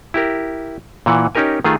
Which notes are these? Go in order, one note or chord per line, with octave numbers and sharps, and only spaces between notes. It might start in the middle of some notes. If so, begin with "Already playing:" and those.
E4 G4 A#4
A#2 E3 F#5
C#4 D#4 G4 A#4 G#5
D#3 A3 F4 G#4